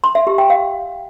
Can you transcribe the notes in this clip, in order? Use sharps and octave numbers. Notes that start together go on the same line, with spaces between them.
C6
E5
G4
G5
F5